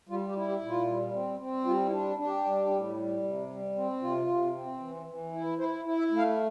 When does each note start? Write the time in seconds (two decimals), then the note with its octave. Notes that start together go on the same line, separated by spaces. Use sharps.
0.09 G3 F4
0.28 G4
0.35 E4
0.48 G4
0.61 A#2
0.68 F4
0.88 G3
1.14 C4
1.40 C4
1.66 G3 F4
1.85 E4
1.92 D4
2.18 D4
2.25 G4
2.45 G3
2.71 A2
2.97 G3
3.23 C3
3.49 G3
3.75 C4
4.02 C3 F4
4.27 C3
4.54 C4
4.80 E3
5.06 E3
5.32 E4
5.58 E4 C5
5.85 E4
5.98 E5
6.11 A3
6.17 F5